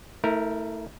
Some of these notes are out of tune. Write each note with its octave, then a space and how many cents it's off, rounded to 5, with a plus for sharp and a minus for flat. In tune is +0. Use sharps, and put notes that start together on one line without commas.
A3 +20 E4 -30 A#4 +0